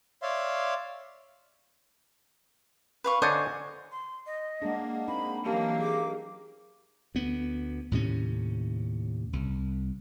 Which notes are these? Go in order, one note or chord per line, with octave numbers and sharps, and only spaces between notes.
C#5 D5 E5 F5 C6
B4 F5 C#6
D3 D4 C5 C#5 D#5 G#5
C6
D#5
G#3 A#3 D4 G#4 F#5
C4 D#4 B5
E3 F#3 A#3 C#4 G4 F5 A5
G#4 D6
D2 B3
D#2 A2 C3 C#4
C2